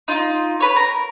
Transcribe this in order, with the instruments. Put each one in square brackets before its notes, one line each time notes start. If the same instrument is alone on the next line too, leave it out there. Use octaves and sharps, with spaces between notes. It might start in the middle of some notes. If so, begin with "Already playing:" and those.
[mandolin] D#4 F4
B4 C#5
A#4